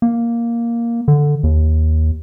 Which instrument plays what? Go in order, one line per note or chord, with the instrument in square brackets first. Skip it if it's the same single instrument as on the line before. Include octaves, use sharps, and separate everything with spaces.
[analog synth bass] A#3
D3
D#2